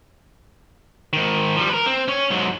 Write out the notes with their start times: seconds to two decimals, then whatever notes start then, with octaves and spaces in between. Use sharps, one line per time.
1.13 G#2 D#3
1.56 F3 G3
1.69 A#4 B4
1.86 C4
2.08 C#4 C#5
2.30 G#2 F#3